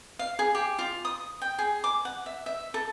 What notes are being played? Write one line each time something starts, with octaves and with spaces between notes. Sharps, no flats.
F5
G#4
G4
F4
D#6
G5
G#4
D6
F#5
E5
E5
A4